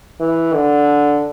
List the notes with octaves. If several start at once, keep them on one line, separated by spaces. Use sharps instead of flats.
E3
D3